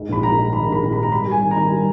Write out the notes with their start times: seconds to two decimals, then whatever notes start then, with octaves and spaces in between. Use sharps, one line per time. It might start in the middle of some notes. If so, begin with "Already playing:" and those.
Already playing: G#2
0.09 A#1 B5
0.23 A#1 A#5
0.38 G#2
0.53 D#3 B5
0.68 A#1 B5
0.82 A#1
0.92 B5
0.97 G#2
1.03 A#5
1.12 G3 B5
1.27 G3 G#5
1.41 D#3
1.51 A#5
1.56 D#3
1.70 G3